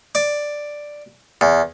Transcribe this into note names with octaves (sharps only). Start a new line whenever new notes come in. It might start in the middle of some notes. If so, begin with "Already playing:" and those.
D5
E2